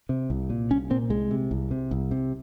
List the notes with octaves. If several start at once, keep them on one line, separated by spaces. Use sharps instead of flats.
C3
C2
A#2
C2 C#4
A#2 C4
C2 G#3
C3
C2
C3
C2
C3